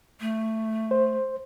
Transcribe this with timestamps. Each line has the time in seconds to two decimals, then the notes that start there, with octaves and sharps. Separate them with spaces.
0.21 A3
0.91 C5